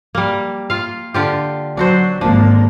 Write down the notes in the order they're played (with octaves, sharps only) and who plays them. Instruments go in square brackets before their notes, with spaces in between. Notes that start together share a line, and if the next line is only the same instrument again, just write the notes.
[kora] G3 A#3
F4 F5
D3 F4 G4
[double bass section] F#3 [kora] D4 F#4 C5
[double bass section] G#1 A#3 [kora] F3 D4